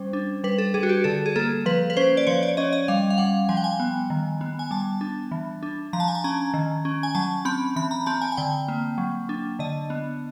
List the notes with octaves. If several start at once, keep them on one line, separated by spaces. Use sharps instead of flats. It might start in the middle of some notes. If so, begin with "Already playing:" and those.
Already playing: G3 C#4 C5
D4
G3 B4
A4
G3 G#4
F#4
G4
D3 A4
G#4
A#3 A4
F3 B4
B4
C#4 C5
D5
F3 C#5
D5
C#4 D#5
D#5
G3 F5
F5
G3 F#5
F3 G#5
G5
G#5
B3
D#3
B3
G#5
G3 A5
D4
E3
D4
F3 A#5
A5
G#5
A5
C#4 A#5
D#3
C#4
G#5
F#3 A5
C4 B5
E3 B5
A#5
C4 A5
G#5
G#5
D3 G5
A#3
F#3
D4
D3 D#5
B3